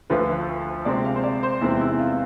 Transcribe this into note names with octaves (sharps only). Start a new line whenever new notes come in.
D2 D3 F3 A3 B4
C3 G#3 C4 D5
F5
C5
D5
C5
E2 C3 G#3 C4 E4
E4
F4